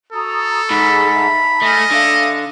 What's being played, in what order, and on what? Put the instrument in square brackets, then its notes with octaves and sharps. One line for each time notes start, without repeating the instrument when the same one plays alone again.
[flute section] F#4 A#5 D#6 [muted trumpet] A4
[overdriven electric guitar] G#2 [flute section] G#4 A#5 [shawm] B5
[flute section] E5 A5 A#5
[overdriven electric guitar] A3 [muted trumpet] D#5 [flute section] G#5 F6
[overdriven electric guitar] D3 [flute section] A4 E5 F5